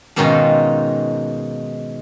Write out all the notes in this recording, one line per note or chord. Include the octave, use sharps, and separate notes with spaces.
G#2 B2 D#3 C#4 D#4 F4